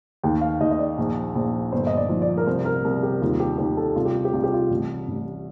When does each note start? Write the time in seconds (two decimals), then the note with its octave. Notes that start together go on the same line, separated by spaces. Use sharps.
0.23 D#2 G5
0.41 F5
0.61 D#2 D#5
0.71 D#5
0.79 D5
0.98 A#1
1.35 A#1
1.72 G1 C5
1.87 D#5
1.97 D5
2.09 F3
2.22 D5
2.38 A#4
2.47 C2 C5
2.65 A#4
2.85 C2
3.03 G4
3.22 D#2 F4
3.40 G4
3.58 D#2 G4
3.77 A4
3.96 C2 F4
4.05 G4
4.15 F4
4.25 G4
4.33 C2 F4
4.44 G4
4.54 F4
4.71 A1
5.08 A1